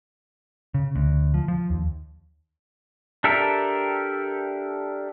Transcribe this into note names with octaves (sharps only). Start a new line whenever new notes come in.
C#3
D2
F3
F3
D#2
D4 G4 A4 A#4 E5